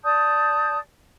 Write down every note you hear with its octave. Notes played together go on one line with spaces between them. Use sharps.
D5 A5 D#6 G6